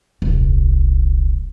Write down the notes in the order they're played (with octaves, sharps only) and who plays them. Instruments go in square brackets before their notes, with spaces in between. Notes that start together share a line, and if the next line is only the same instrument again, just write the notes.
[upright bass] D#1 C2